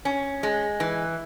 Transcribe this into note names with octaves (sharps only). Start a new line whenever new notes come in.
C#4
G#3
E3